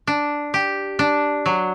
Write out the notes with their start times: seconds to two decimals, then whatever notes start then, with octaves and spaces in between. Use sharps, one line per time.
0.07 D4
0.54 G4
0.99 D4
1.46 F#3